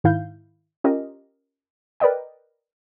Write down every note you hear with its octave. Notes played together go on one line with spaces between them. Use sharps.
G#2 D#3 E4 F5 G6
C#4 F4 G4 A#4 D#5
A#4 B4 D5 D#5 G5